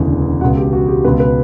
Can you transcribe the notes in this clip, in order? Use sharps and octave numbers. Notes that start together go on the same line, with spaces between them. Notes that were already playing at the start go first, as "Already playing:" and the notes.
Already playing: E1 D2 C#3 E3
C#2 B2 F#5
G4
F#4
G4
C#2 B2 B4
B4